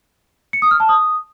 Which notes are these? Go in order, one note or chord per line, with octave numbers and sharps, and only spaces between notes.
C#7
D#6
F6
A5
D#6